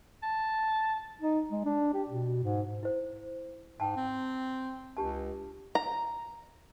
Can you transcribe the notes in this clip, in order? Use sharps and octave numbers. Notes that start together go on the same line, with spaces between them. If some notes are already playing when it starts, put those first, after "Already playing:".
A5
D#4
G#3
D4
G4
B2
G#2
E4 C5
G#2 G5 A5
C4
C#2 D4 G4 A5
A#5